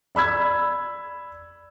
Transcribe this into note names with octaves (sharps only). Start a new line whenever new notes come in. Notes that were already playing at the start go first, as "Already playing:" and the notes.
D5 B5 E6 G#6